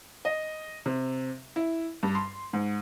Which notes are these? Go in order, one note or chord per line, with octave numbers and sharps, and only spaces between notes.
D#5
C3
E4
G2
C6
G#2